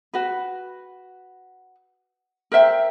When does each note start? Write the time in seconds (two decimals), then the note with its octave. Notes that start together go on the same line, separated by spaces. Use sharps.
0.14 F#4 B4
2.52 A#4 C5 E5 G5